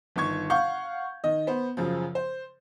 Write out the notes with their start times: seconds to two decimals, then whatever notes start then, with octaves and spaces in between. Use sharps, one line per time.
0.16 G1 D#3 C#6 G#6
0.50 F5 F#5 C#6 G6
1.24 D#3 D#5
1.47 B3 C5
1.77 F#2 C#3 F3
2.15 C5